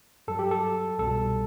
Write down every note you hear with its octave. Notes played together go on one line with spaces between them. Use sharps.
G2 F#3 A4
G4
A4
C2 B2 G3 A4